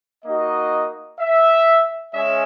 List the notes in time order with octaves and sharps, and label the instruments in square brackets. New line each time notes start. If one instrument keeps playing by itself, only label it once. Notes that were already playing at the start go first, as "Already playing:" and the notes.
[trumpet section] A#3 D#4 F#4 D#5
E5
G#3 C#4 E5